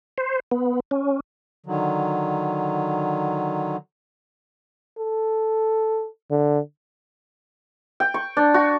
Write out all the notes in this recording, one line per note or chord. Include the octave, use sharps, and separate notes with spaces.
C5
B3
C#4
D3 D#3 F#3
A4
D3
G5
C#6
D4
F#4